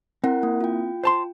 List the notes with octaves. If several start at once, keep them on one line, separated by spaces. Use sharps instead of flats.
C4 E4 A#4 F#5
A#3 E4
F4 G5
C5 A5 C6